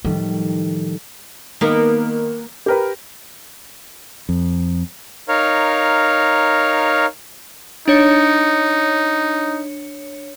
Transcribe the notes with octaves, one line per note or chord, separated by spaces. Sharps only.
A2 D#3 F3 G3
D#3 A#3 B3 A#4
G4 A#4 B4
F2
D#4 A#4 C#5 F5
D4 D#4 C#5 C#7